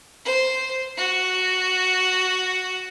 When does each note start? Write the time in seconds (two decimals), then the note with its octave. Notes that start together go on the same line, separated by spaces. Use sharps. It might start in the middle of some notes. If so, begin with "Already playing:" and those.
0.25 C5
0.97 F#4